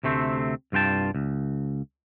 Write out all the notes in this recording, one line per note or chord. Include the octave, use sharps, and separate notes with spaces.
D2 C3 A3 C4
C2 G2 F4 G5 A5
C#2